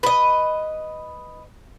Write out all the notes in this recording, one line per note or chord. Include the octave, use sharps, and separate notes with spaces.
B4 D#5